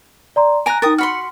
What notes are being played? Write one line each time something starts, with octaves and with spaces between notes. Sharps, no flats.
D5 A#5 C6
G#5 A#5 F#6 A#6 D7
D#4 A#4 G5 D#6 A6
F#4 B5 C6 F6 C#7